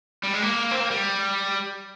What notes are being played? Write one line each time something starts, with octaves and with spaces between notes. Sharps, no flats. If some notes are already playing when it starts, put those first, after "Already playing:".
G3
G#3
A#3
C4
A#3
G3